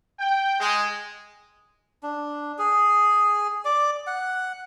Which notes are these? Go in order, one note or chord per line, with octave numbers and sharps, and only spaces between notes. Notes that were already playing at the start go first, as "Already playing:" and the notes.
G5
G#3
D4
G#4
D5
F#5